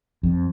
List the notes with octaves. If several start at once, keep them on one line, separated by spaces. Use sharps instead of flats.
F2